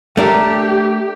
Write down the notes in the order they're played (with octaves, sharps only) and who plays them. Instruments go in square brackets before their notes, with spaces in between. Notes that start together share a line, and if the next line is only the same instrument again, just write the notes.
[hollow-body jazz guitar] A3 D4 A#4 [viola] G4